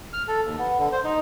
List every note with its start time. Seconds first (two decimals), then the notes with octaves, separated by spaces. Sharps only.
0.13 F6
0.28 A4
0.45 D#2
0.58 B3
0.78 D3
0.92 C5
1.04 D#4